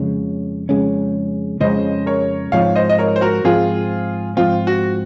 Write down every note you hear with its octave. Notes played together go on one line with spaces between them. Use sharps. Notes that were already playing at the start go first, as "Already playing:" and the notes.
Already playing: F2 C#3 G#3 C#4
F2 C#3 G#3 C#4
F2 C#3 G#3 C#4 C5 D#5
A#4 C#5
G#2 F3 C4 C#5 F5
C5 D#5
D#5
A#4 C#5
C5
F#4 A#4
G#2 F3 C4 F4 G#4
G#2 F3 C4 F4
F#4